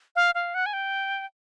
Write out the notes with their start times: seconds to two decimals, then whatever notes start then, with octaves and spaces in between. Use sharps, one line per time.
0.16 F5
0.35 F5
0.54 F#5
0.66 G#5
0.73 G5